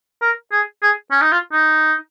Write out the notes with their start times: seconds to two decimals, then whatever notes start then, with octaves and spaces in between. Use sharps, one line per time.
0.22 A#4
0.52 G#4
0.82 G#4
1.11 C#4
1.22 D#4
1.32 F4
1.52 D#4